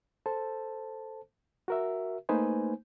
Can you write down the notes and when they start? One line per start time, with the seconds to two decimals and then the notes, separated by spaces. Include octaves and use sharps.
0.26 A4 C5 A5
1.68 F#4 A#4 E5
2.29 A3 A#3 D#4 B4 C5 G#5